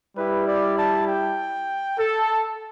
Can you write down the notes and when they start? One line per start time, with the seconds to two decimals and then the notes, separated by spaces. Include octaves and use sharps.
0.17 G3 E4 G4 B4
0.46 D5
0.78 A5
1.07 G5
1.98 A4